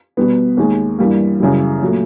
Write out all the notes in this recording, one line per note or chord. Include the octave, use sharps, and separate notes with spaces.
B2 G3 B3
D#2 D#3 G#3
G2 E3 G3 A#3
F#2 C#3 E3 G3
A#2 F#3 A3